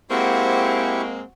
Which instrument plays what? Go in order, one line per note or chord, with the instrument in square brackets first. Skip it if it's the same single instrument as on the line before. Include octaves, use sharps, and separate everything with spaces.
[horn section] G#3 A#3 C4 [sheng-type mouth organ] E4 G4 C#6 [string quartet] F#4 C5